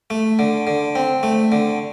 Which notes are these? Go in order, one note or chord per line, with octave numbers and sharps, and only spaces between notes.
A3
D3
D3
C4
A3
D3